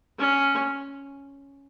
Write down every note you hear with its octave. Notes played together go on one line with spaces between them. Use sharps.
C#4